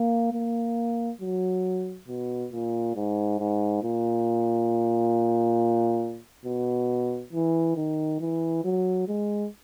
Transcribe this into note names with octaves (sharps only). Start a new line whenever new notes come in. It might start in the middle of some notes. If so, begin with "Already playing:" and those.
Already playing: A#3
A#3
F#3
B2
A#2
G#2
G#2
A#2
B2
E3
D#3
E3
F#3
G#3